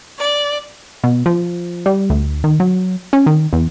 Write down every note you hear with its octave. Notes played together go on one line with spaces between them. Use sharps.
D5
B2
F3
G3
D2
D#3
F#3
C#4
D#3
E2